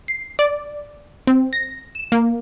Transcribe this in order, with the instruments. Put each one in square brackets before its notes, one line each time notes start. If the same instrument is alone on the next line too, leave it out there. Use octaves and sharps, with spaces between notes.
[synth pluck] C7
D5
C4
A#6
E7
A#3